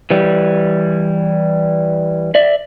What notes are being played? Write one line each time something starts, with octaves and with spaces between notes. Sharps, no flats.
E3 G3
D5 E5